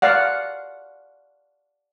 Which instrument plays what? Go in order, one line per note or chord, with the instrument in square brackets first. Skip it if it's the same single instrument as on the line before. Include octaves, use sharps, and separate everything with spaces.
[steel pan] D5 F5 F#5